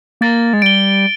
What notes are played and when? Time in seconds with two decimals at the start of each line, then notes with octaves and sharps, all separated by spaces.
0.21 A#3 A6
0.53 G#3
0.62 G3 D7 G7